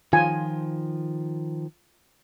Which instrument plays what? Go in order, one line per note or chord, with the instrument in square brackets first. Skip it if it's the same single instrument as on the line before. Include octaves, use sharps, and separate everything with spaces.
[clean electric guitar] D#3 F3 [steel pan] F4 G#5